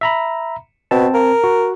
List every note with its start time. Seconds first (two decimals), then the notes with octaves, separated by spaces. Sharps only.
0.01 E5 A#5 B5
0.91 B2 C4 A5
1.14 A#4
1.44 F#4